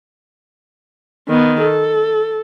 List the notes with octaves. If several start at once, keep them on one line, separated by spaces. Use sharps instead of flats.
D#3 B3
A4